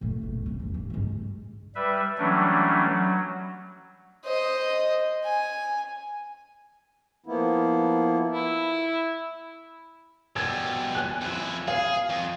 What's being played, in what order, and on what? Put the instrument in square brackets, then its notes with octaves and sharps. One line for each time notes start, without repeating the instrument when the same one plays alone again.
[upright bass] A#2 A3
F#1 B2
D2 C4
E2 F3
A1
G#2 G#3
[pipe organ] G3 B4 E5
E3 F#3 G3 A3 C#4 D4
F#3
[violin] C5 D#5
G#5
[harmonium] F3 A#3 B3 E4
[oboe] E4
[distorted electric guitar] B2 G3 [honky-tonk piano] G#5 E6 G#6
[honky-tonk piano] G#5 F#6
[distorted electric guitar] F2 E4
[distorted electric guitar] G#4 [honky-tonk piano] F5
[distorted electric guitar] F2